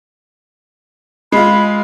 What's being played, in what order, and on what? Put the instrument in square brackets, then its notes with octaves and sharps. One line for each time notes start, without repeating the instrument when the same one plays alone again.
[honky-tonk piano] G#3 F4 [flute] B5